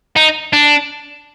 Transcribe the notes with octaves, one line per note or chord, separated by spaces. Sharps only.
D#4
D4